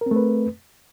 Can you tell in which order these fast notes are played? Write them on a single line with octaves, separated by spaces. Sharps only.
A#4 C4 A3 B4